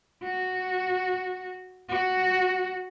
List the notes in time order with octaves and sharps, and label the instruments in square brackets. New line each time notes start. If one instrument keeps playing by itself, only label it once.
[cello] F#4
F#4